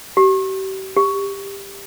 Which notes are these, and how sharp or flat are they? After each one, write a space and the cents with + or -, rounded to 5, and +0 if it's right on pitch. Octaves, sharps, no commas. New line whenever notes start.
G4 -40
G4 +20